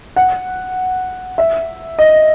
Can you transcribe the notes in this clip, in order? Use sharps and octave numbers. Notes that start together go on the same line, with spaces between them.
F#5
E5
D#5